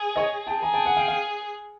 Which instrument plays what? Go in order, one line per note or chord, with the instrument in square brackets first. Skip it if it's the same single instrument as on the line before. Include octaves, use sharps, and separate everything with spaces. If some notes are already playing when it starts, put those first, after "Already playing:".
Already playing: [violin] G#4
[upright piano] C#5 D#5
G5 A5
[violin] G#4 [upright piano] G#5 A#5
[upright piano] G5 A5
F#5 G#5
F5 G5
F5 G5